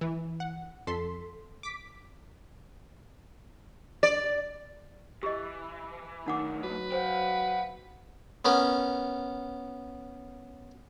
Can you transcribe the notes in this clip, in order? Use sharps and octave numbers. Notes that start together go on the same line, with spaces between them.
E3
F#5
F2 A4 C6 B6
D6 B6
D5
E3 G4 D#5
B1 D#3 A3 D4 F#5 D6
F#3 B4
C5 F#5 G5
B3 C#4 A#4